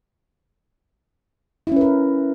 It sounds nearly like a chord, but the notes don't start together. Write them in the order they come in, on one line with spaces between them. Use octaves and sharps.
E4 C#4 B4 A#4